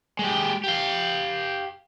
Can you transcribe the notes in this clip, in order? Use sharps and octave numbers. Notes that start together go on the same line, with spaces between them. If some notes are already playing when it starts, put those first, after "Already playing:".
G#3 G4
G4 F5